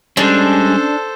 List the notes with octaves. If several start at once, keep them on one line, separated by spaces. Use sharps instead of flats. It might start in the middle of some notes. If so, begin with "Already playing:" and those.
G3 G#3 C#4 D4 A4 C5